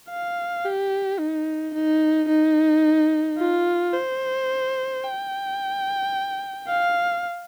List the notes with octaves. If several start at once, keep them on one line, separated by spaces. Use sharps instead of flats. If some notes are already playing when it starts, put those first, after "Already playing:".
F5
G4
D#4
D#4
D#4
F4
C5
G5
F5